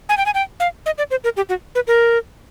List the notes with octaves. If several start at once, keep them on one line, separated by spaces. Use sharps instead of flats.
G#5
G5
G#5
G5
F5
D#5
D5
C5
A#4
G4
F#4
B4
A#4